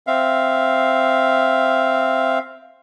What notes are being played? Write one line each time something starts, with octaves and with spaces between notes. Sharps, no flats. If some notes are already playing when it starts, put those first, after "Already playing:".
C4 E5 F5